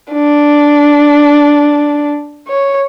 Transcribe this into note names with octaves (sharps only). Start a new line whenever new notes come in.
D4
C#5